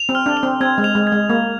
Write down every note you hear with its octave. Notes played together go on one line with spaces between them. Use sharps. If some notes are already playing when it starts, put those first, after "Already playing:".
Already playing: F7
C4
F6
D4
F7
C4
C4 G#6
G#3
F7
G#3
G#6
G#3
A#3 G#6